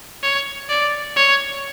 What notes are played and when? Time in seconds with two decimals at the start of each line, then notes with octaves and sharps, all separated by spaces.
0.23 C#5
0.69 D5
1.16 C#5